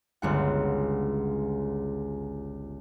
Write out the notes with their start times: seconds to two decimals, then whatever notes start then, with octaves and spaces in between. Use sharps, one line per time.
0.22 G1 C#2 F#5